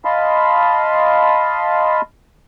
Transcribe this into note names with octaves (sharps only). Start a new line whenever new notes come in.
D#5 F5 A5 B5 C6